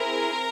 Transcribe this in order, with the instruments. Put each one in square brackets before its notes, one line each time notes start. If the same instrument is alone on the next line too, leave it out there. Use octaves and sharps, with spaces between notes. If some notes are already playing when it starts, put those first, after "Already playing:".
Already playing: [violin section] C4 E4 G#4 A#4